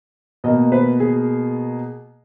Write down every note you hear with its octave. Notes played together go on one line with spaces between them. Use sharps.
B2 A#3 D#5
B4
G#4